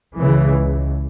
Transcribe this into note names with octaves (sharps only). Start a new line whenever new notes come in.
C#2 C#3 E3